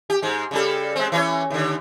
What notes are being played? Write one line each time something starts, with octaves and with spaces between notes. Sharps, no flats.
G4
G#2 G#3
C#3 G3 A4
G#3 C4
E3 C#4 C#5
D#2 D3